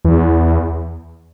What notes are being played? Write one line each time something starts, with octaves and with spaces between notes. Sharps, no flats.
E2